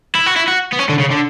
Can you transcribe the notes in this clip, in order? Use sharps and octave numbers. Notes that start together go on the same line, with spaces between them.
E4
F#4
E4
F#4
B3
C#4
D3
C#3
D3